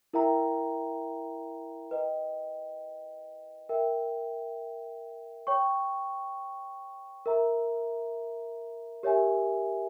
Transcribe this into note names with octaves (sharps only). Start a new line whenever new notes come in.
E4 A#4 E5 G5 A#5
B4 D#5 G5
A#4 E5 G5
C#5 G5 C#6
A#4 E5 A#5
G4 A#4 C#5 E5 G#5